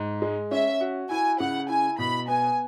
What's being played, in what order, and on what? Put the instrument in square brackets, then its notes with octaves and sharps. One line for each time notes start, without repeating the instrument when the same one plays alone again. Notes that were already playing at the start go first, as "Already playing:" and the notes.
Already playing: [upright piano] G#2
G#3
[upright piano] C#4 [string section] E5
[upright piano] F#4
[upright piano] E4 [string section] G#5
[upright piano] C#3 [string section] F#5
[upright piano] E4 [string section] G#5
[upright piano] B2 [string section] B5
[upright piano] B3 [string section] G#5